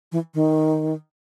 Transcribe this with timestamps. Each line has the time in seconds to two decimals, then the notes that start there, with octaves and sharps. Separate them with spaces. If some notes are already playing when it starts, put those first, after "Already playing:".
0.12 E3
0.34 D#3